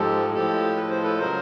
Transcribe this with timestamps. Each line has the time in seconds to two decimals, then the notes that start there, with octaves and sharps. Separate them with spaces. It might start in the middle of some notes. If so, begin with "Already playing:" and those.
Already playing: G#2 F3 G#3 G4 A4
0.34 A2 F3 G#3 G4 A4
0.76 B4
0.89 C5
1.03 A4 B4
1.19 C#3 F#3 A#4 C5